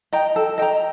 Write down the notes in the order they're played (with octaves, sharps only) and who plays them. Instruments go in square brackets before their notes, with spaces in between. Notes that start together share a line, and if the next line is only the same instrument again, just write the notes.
[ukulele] D#5 G5 A#5
A4
D#5 G5 A#5